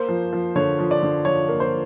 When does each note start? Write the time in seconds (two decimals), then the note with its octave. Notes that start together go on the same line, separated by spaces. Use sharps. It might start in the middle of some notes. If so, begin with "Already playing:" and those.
Already playing: A#3 C5
0.09 F3
0.33 F3
0.56 D3 C#5
0.79 F3
0.91 D5
1.03 D3
1.25 F3 C#5
1.49 A#3
1.60 C5